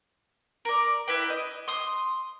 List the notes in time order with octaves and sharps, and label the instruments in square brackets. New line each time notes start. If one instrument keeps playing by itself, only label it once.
[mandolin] A#4 D5
E4 B4 G5
D#5
C6 D#6